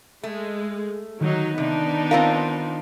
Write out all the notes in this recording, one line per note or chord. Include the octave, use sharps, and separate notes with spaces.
G#3 A3
D#3 F#3 D#4
C3 B3 D4 D#4
C4 F4 A#4 F5 A5